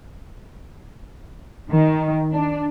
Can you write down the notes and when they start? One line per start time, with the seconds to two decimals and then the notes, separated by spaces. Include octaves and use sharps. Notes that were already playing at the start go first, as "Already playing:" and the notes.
1.70 D#3
2.31 D4